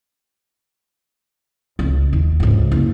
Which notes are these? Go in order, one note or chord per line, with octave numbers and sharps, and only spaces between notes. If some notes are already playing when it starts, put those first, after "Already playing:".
C#2
D#2
C#2 G#2
F#1